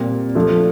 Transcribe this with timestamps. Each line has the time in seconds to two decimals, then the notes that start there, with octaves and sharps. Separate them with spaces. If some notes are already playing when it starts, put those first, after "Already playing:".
Already playing: A#2 G3 C4
0.35 F3 A3 D4 F4 A4